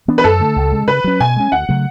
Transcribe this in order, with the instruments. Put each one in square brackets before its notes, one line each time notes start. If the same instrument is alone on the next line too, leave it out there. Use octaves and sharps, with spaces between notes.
[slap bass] E3 B3 D4
[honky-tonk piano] B4
[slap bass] F#2 [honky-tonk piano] A4
[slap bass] D3 A3
C#2
C#3 G#3
[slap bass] C#3 [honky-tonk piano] B4
[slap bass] F#3 C#4
[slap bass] B2 [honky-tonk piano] G#5
[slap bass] G#3 C#4
[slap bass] D2 [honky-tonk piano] F#5
[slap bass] C#3 F#3 A3